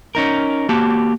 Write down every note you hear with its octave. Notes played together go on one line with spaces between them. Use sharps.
C#4 D#4 A#4
A#3 F#4 G4 A5